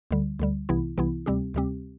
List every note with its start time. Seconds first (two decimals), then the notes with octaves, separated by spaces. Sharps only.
0.11 D2 D3 G3
0.39 D2 D3 G3
0.69 C2 C3 E3 B3 E4
0.98 C2 C3 E3 B3 E4
1.26 D2 C3 G3 C4 G4
1.54 D2 C3 G3 C4 G4